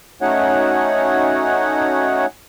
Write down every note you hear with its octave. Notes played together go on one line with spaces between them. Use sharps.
A3 C#4 D#4 F#4 C#5 F#5